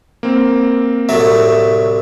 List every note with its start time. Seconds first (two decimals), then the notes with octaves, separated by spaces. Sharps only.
0.23 A#3 C4
1.09 C2 A2 F#3 E5